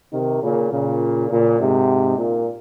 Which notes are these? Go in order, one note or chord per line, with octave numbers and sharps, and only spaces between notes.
C3 D#3
A#2 C#3
A#2 C#3
A#2 C#3
G#2 C3
A#2